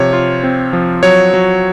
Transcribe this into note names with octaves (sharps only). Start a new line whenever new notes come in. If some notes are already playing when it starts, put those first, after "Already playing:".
Already playing: C3 F3 C#5
F4
C4
F3
F#3 C#5
F#3